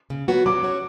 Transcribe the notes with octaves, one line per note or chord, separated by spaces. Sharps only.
C#3
F#3 B3 F#4
F#3 D6
C#4 F#4 C#5